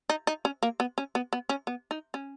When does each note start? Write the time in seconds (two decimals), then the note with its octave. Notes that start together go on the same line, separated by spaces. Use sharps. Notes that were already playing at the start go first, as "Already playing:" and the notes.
0.10 D#4
0.27 D#4
0.45 C#4
0.63 A#3
0.80 B3
0.98 C#4
1.15 B3
1.33 B3
1.49 C#4
1.67 B3
1.91 D#4
2.14 C#4